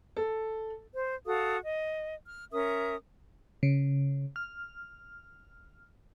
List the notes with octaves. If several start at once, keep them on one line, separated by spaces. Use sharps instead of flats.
A4
C5
F#4 A4 F5 D#6
D#5
F6
C#4 A#4 E5 D#6
C#3
F6